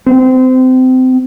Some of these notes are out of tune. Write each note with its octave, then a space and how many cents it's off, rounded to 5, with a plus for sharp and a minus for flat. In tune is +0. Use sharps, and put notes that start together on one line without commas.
C4 -25